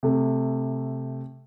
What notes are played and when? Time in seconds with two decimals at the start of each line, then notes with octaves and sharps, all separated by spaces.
0.03 C3 A3